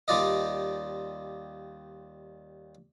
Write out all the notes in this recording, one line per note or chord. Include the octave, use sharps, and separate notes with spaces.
D#2 G3 F4 D5 D#5